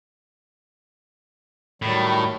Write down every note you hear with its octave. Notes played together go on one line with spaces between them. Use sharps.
A2 D#3 F#3 G3